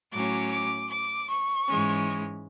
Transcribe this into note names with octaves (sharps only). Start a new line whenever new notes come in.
A2 F#3 C#4 D6
D6
D6
C#6
G#2 E3 G#3 C#4